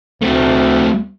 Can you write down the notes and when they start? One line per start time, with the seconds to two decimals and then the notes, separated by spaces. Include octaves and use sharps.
0.22 D2 A3 C4